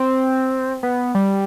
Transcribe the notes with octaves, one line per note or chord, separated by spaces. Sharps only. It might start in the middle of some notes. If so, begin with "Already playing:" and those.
Already playing: C4
B3
G3